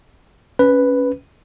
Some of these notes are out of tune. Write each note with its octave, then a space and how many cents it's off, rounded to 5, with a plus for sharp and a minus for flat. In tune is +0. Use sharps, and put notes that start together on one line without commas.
C#4 +5 B4 +0